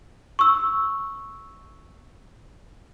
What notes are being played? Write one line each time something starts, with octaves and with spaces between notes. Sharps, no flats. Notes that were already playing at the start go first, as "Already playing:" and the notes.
C#6 E6